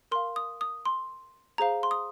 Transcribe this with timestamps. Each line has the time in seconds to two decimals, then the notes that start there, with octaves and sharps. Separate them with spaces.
0.11 A#4 C6
0.15 F5
0.36 D#6
0.61 D#6
0.85 C6
1.58 G#4 C5 F5 A#5
1.83 C6
1.91 D#6